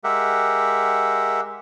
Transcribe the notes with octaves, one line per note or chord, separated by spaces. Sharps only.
G#3 G4 A#4 E5 F#5